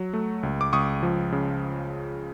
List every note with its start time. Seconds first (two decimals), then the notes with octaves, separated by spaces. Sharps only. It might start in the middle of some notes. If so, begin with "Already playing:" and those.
Already playing: F#3
0.13 A3
0.43 C#2
0.61 D6
0.73 C#2 C#6 D#6
1.03 F3
1.32 C#3